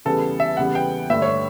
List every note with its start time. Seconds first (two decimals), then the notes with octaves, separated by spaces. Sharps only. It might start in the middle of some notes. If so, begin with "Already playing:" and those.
0.05 E2 C#3 G3 B3 A4
0.40 E5
0.57 E2 C#3 G3 B3 F#5
0.75 G5
1.10 G2 D3 A3 E5
1.22 C#5